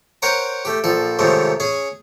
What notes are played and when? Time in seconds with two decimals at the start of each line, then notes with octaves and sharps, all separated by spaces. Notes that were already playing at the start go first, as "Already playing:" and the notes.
0.22 A#4 C5 C#5 F#5 G5 A#5
0.65 A3 G4
0.84 A#1 F3 A4
1.19 G#2 C3 D#3 F3 A3 C#4
1.60 C#4 G#4 G#5